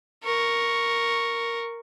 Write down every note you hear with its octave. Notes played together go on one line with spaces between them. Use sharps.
A#4 C#6